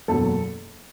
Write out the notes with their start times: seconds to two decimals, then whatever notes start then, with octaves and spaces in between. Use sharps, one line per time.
0.08 F#1 E2 B2 F#3 A4